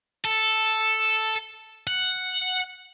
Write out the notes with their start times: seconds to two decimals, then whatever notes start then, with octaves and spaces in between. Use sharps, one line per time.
0.25 A4
1.87 F#5